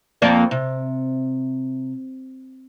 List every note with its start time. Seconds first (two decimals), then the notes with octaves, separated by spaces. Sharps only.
0.22 F2 A#3 D5
0.51 C3